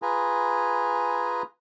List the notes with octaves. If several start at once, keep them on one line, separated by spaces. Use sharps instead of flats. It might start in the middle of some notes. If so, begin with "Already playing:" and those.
F4 G#4 B4 G#5 A#5